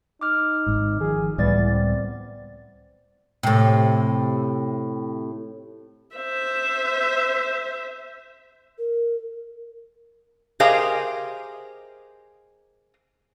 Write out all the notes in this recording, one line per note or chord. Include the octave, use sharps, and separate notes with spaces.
D#4 D6 F6
G#1 G#2
D#3 F3 G#4
C#2 A2 E3 G3 B3 D5 A6
C4
A2 C3
C5 E5
A#4
G4 G#4 A#4 C5 D#5 F5